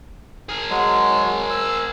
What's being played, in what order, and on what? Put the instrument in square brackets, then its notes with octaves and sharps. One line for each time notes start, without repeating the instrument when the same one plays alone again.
[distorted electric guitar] G#4 A#4
[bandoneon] F#3 G#3
E6